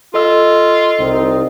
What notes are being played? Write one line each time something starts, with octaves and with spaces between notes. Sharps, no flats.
F4 A4 D#5 E6
C2 C4 D#4